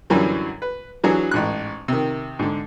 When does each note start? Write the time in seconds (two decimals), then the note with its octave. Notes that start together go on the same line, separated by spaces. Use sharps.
0.10 F#2 D3 E3 F#3 G3
0.62 B4
1.04 E3 F#3 D4 F#4 G#4
1.31 A1 G#2 F#6
1.88 C3 D#3
2.39 G#2 D3